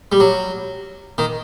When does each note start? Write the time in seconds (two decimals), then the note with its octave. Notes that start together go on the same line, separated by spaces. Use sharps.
0.12 G3
0.20 F#3
1.18 D#3